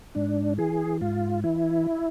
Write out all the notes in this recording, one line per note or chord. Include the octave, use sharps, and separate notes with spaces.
G#2 D4
E3 G#4
G#2 F4
E3 E4